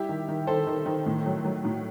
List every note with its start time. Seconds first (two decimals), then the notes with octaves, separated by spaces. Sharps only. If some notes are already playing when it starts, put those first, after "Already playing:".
Already playing: G3 E4 G4
0.09 D#3
0.29 D#3
0.47 D#3 A4 C5
0.67 D#3
0.86 D#3
1.06 A2
1.26 F#3
1.45 F#3
1.65 A2